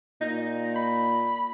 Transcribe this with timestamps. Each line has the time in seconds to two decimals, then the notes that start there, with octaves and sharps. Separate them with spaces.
0.21 A#2 D#4
0.76 B5